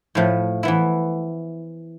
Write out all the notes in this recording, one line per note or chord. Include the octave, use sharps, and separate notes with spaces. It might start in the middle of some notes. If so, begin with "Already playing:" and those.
A2 F3 A3
E3 B3 E4